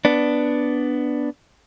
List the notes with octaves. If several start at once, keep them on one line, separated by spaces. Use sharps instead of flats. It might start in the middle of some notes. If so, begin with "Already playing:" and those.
B3 D4